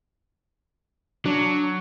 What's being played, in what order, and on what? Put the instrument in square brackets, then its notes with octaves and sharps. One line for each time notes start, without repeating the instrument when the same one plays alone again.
[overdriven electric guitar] F#3 [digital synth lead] D4